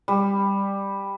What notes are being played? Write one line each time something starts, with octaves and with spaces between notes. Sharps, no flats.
G3